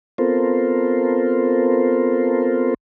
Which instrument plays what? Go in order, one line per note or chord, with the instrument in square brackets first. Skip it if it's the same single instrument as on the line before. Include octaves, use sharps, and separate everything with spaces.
[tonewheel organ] B3 C4 F4 A4 A#4 C5